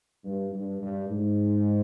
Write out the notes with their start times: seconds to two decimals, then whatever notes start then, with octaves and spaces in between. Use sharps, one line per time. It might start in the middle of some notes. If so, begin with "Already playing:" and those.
0.25 G2
0.53 G2
0.82 G2
1.09 G#2